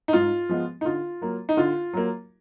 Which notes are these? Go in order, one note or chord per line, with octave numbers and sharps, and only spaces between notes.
D#4
G#2 F4
F3 G#3 B3
D#4
D3 F4
F#3 A#3
D#4
D3 F4
F#3 A#3